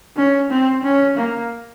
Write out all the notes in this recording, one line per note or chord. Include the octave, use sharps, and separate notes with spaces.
C#4
C4
C#4
A#3